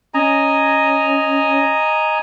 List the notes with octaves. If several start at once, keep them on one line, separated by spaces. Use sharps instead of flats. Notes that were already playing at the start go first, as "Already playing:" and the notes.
C#4 D#5 G#5 A#5